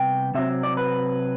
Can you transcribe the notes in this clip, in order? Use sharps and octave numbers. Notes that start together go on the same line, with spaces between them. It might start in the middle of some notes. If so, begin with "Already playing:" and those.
Already playing: C3 G3 B3 G5
C3 F#3 C4 E5
D5
B4